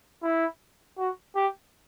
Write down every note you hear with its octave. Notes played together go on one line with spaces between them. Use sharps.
E4
F#4
G4